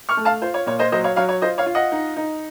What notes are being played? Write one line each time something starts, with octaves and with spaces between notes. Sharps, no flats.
C#6 F6
A3
F5 A5
F4 C5
C#5
A#2 C#5
C5 D#5
F#3 C5 D#5
C#5 F5
F#3 C#5 F5
C#5
F4 C5 D#5
C#5 F5
F4
D#5 F#5
D#4
D#4